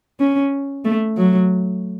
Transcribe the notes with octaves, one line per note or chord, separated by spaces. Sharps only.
C#4
A3
F#3